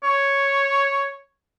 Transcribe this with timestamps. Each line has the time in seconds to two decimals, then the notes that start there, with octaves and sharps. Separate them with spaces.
0.04 C#5